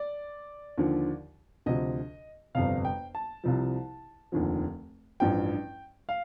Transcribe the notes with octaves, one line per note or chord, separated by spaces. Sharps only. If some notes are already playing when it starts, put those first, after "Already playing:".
Already playing: D5
D#2 D3 F3
D2 C3 F3 D#5
G1 F2 C3 F5
G5
A5
C2 C3 F3
F1 D#2 D3 F3
A1 G2 F3 G5
F5